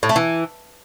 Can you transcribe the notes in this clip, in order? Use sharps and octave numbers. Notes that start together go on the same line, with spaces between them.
A2
A3
E3